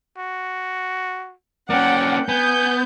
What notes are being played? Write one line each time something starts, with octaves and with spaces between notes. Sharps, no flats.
F#4
A#3 C#4 D5 F#5 G5
B3 G#5 G6